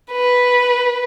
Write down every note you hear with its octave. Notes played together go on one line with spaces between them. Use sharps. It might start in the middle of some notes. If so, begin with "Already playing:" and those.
B4